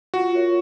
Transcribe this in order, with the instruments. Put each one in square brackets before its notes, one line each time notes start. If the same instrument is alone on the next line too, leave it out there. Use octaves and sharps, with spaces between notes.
[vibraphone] F4 [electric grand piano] F#4
[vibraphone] A#4 C#5 E5